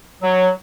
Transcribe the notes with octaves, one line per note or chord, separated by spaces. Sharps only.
F#3